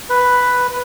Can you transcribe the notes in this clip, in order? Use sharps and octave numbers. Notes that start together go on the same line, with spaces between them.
B4